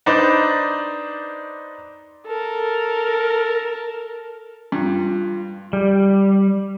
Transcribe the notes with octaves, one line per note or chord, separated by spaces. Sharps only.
D4 D#4 B4 C5 D5
A4 A#4
G2 F4
G3